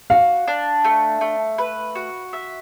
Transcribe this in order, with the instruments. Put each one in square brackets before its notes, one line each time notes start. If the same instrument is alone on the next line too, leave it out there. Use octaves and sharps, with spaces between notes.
[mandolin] F#4 [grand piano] F5
[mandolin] D4
A3
A3
B4
F#4
E5